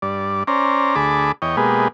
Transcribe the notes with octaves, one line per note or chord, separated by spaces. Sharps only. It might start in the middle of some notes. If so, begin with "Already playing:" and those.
G2 D5
C#4 C5 D5 A#5
D2 G#4 A5 B5 D6
E2 C#5 D#5 G5
B2 G#3 A#3 G4 G#4 B4